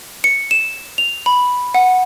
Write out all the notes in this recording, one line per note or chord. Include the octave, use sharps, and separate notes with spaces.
C#7
E7
F7
B5
F#5